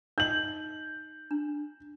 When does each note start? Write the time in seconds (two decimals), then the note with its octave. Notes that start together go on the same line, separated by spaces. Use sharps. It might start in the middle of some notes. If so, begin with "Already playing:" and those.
0.18 D#4 D#5 G6 F#7
1.31 D4